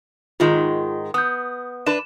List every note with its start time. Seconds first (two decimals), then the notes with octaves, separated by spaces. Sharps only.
0.40 G#2 D#3 G#3 F4
1.14 B3 D#6 G6
1.87 D4 B4 E7